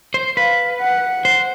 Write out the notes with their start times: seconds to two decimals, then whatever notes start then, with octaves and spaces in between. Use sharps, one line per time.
0.14 C5
0.37 B4 F5
0.81 F#5
1.25 C5